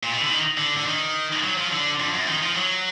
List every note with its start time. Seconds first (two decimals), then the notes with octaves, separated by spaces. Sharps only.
0.03 A#2
0.11 B2
0.21 D3
0.29 D#3
0.57 D3
0.77 D3
0.86 D#3
1.43 F#3
1.57 F3
1.71 D3
1.99 F2
2.14 F#2
2.28 D#3
2.43 F3
2.56 F#3